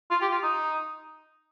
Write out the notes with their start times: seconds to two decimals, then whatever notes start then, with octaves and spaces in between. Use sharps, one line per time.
0.11 F4
0.21 G4
0.31 F4
0.43 D#4